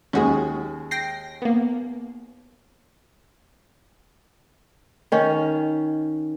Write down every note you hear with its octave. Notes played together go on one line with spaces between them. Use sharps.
D#2 G#3 C#4 F#4 G#4
G5 A#6 C7
A#3 B3
D#3 C#4